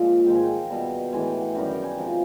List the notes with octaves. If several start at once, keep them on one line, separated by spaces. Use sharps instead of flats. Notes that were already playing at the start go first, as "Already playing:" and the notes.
Already playing: A#2 F3 G#3
G#2 D#3 G#3 G5
G#5
G5
B2 G3
A2 E3 G#3 G#5
G5
F#5
F#2 D#3 G3 F#5
G5
G#5
C3 F3 G#3